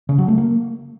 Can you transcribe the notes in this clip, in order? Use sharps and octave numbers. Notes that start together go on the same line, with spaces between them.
C#3
F#3
A3
A#3